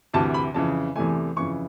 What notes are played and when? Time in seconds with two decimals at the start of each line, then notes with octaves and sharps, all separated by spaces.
0.13 D2 C3 E3 A5
0.34 B5
0.54 F2 C#3 E3 A5
0.96 E2 C3 E3 A3 G#5
1.36 F2 C#3 E3 C#6